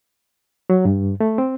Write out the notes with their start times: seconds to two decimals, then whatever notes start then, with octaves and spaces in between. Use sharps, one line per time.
0.70 F#3
0.85 G2
1.20 A3
1.38 C4